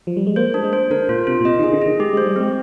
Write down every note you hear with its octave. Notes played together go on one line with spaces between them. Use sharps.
F3
G3
G#3
A#3 C5
D4
G#3
C5
D3 A#4
A#2 F4
C3 F4
A#2
C3 D#5
D#3
G#4
D3
D#3 G#4
G#3 G4
G#3
C5
G3
G#3 C4